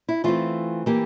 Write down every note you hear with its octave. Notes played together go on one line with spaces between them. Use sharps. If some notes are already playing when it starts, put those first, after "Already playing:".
E4
E3 A3 C4 F4
E3 A#3 G4